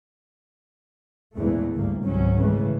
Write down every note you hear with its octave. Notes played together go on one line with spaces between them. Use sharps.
A#1 E2 A#2 E3 G#3 A3
G1 D2 A#2 A#3
G#1 C#2 C3 F#3 C#4
A#2 C#3 E3 G#3 A3